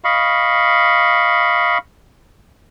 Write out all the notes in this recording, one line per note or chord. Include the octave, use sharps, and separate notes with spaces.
D#5 F5 B5 C#6